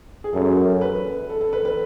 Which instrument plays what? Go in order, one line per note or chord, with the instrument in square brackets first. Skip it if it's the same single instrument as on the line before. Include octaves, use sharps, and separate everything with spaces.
[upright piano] G#4
[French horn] F#2 [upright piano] A4
[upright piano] B4
A4
A4
B4
B4